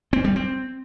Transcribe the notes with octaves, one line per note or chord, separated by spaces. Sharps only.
C4
G3
C4